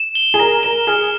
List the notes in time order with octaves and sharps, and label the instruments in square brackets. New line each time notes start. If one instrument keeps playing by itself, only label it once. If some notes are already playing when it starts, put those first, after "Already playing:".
Already playing: [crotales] E7
G7
[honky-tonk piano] G#4
[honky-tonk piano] A#4 [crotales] A#6
[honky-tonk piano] A#4 [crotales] E7
[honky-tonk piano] G#4 [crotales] F6